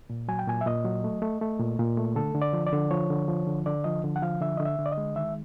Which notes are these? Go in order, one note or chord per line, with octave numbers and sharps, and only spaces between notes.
A#2
F#3 G#5
G5
A#2 G#5
E5
A#2 D#5
F#3
A3
A3
A3
A#2
A#2
A3
D3 A4
D3
D5
F3
D5
D3
F3 C#5
D3
F3
D3
D3 D5
F3 D#5
D3
F#5
F3 F5
D3 E5
D3 D#5
E5
D3
D5
D#5
G#3
D#3 E5